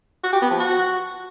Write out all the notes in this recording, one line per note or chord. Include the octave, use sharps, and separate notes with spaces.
F#4
G4
B3
F3
F#4